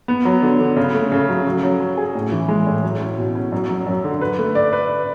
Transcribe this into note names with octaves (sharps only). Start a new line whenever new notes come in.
B3
F#3
D3
D3
C#3
A3
C#3
F#3
F#3
F#3
C#4
G#4
A2
E3
G#3
A2
F#3
C#4
B2
C#4
F#2
F#3
F#2
D3
B4
A3
D5
B4